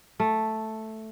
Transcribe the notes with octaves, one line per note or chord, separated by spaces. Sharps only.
A3